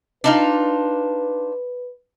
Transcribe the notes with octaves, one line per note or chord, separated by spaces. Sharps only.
D4 D#4 F4 B4